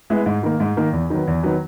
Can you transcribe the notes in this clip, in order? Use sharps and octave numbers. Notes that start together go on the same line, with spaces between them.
G#3 B3 E4
G#2
D#3 A#3
G#2
D#3 A#3
E2
D#3 F#3 B3
E2
D#3 F#3 B3